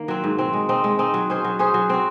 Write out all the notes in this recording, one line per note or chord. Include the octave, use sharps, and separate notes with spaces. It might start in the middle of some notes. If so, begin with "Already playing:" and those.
Already playing: D#3 A#3
F#3 C4
G#2
F#3 C4
G#3
C4 D#4
G#3
C4 D#4
F#3
C#4 G#4 C5
F#3
C#4 G#4 C5
F#3
C4 F#4